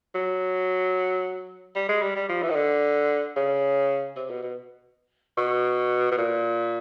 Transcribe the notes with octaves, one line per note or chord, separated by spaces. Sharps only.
F#3
G3
G#3
G3
G3
F3
E3
D#3
D3
C#3
C3
B2
B2
B2
B2
A#2